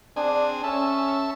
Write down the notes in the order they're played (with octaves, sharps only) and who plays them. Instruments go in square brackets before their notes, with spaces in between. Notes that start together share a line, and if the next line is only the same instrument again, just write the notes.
[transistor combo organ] C4 G#4 G#5 [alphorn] D4
[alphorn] C#4 [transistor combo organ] A4 E5 A5